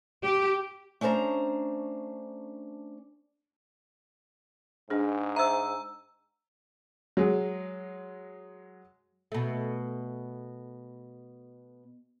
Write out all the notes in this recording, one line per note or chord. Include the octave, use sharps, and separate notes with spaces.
G4
A3 C#4 D4 C5 A#5
G#2 D4 G#4
C5 E5 A#5 E6
F#3 G#3
B2 A3